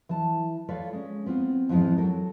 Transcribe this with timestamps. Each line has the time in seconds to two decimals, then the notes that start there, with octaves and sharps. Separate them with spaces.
0.09 E3 A5
0.68 F4 A4 B4 C#5 D5 F5
0.93 G#3 C#4
1.26 B3 C4 F4
1.69 F2 G#2 E3 F3 G#3
1.98 F#3 A4 A#4